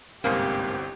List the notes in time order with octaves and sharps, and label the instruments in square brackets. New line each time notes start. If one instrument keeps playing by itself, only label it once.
[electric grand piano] G1 C2 C4 [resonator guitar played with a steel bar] G#2 A#3 [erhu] G4